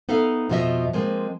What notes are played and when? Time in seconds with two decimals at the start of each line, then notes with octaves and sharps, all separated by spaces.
0.09 B3 D#4 A4 E5 F5
0.49 F2 B2 F3 F4 D#5 E5
0.93 F3 G#3 A#3 C4